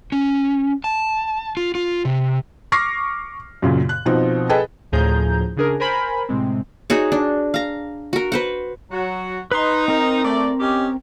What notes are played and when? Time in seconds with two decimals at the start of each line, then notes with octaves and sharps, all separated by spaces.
0.12 C#4
0.84 A5
1.57 F4
1.75 F4
2.05 C3
2.72 C#6 D6 F6 A#6 C7
3.62 F#2 A#2 C#3
3.89 F#6
4.06 B2 F3 C4 D#4
4.49 G#4 A4 B4 D#5 G5 A5
4.92 D2 A2 F3 G#4 A#5 G6
5.57 C#3 D4 G#4 A#4
5.80 A#4 C5 G#5 B5
6.29 A2 C3 G#3 C4
6.90 D#4 F#4 G#4 C#5
7.12 D4
7.54 F5 A#5
8.13 F#4 A#4
8.32 B4 C5 F#5
8.91 F#3 F#4
9.52 D#4 B4 C6
9.88 C4 A#4
10.24 A3 D5
10.60 C#4 G4 D#5